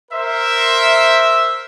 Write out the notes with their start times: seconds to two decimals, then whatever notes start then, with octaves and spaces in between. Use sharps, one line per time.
0.11 A#4 C5 E5